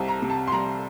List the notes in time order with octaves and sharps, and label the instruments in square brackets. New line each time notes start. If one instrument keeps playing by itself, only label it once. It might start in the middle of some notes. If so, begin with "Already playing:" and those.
Already playing: [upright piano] C2 C4 A5
A#5
C3
A5
C6
G3 A#5